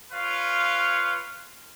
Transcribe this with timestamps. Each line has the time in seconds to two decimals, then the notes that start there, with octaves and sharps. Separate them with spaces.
0.12 F4 B4 C#5 F5